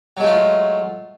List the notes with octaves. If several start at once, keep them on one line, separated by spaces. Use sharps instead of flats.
F#3 G#3 A3 F4